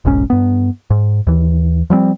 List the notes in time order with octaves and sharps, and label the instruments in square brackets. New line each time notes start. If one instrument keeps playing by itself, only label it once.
[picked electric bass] F1 B1 G#2 C#4
G2 B3
G#2
D#2 E3
F3 G3 A3 C4